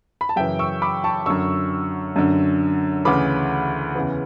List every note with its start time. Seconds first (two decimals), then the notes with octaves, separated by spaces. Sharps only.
0.21 B5
0.29 A5
0.36 F#2 C#3 E3 E5 G5
0.59 C#6 E6
0.82 B5 D6
1.04 A5 C#6
1.26 F#2 D3 C#6 E6
2.16 F#2 D3
3.05 D2 C#3 E3 B5 D6
3.95 E2 C#3 E3